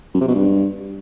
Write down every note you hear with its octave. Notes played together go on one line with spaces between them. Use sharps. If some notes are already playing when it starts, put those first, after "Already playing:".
F#2
C3
B2
G2